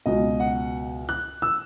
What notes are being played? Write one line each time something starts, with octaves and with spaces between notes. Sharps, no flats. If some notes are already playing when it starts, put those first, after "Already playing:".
C#2 B2 F#3 D#5
F#5
F#6
E6